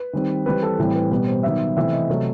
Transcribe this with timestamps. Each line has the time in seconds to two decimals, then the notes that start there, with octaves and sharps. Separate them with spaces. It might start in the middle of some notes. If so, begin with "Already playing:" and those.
Already playing: B4
0.13 D#3 G3 C4
0.46 E3 G3 C4 B4
0.63 A4
0.79 A2 E3 G3 C4
0.94 B4
1.11 B2 G3 B3 B4
1.27 C5
1.43 D#3 F#3 B3 E5
1.76 C3 E3 A3 C4 E5
1.93 D#5
2.09 C3 F#3 A3